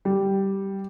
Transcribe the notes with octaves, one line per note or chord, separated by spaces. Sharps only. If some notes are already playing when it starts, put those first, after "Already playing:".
G3